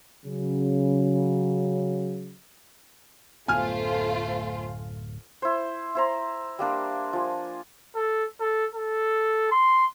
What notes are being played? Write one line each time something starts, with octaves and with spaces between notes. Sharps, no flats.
C#3 F#3
D1 F#2 A3 B3 F4 C5 G#5 F6
E4 C5
E4 C5 A#5
G3 A#3 D4
F3 G#5
A4
A4
A4
C6